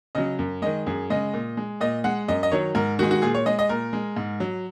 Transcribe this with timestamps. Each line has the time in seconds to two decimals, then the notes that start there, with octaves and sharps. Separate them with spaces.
0.15 C#3 F#3 D#5
0.39 F#2
0.62 D#3 G#3 D#5
0.86 F#2 G#4
1.10 C#3 G#3 D#5
1.34 A#2
1.57 G#3
1.81 A#2 D#5
2.04 G#3 F#5
2.28 F#2 D#5
2.43 D#5
2.52 D#3 F#3 C#5
2.75 G#2 A#4
2.99 D#3 F#4
3.02 G#3
3.11 F#4
3.22 A#2 G#4
3.35 C#5
3.46 G#3 D#5
3.59 D#5
3.69 A#2 A#4
3.93 G#3
4.17 G#2
4.40 F#3